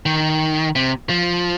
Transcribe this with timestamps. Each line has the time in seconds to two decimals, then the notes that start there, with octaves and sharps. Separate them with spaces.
0.06 D#3
0.76 C3
1.10 F3